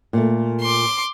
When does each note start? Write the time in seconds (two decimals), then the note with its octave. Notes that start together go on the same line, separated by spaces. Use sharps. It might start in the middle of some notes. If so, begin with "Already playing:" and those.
0.13 A#2 A3
0.61 C6 D6